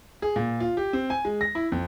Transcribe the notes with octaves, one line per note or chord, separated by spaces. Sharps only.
G#4
A#2
F4
G4
C4
G#5
G#3
A#6
E4
F2